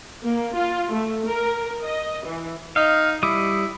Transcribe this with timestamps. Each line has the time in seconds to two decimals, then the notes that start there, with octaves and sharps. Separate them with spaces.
0.23 A#3
0.55 F4
0.93 A3
1.26 A#4
1.84 D#5
2.26 E3
2.76 D#4 F5
3.23 G3 E4 D6 D#6